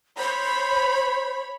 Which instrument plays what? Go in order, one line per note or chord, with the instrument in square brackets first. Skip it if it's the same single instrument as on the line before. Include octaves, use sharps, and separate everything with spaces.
[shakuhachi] C5 [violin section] C#5 B5